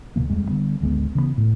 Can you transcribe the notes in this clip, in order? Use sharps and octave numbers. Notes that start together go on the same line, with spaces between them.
D2 B2 E3 A#3
D#1 F2 G3 G#3
D3 E3 G3 B3
G#1 D2 G#3 B3
C#3 E3 G3 B3
A2